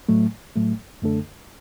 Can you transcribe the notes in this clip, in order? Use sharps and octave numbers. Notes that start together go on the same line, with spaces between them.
A2 F#3 A3
A2 F#3 A3
F#2 D3 A3 D4 A4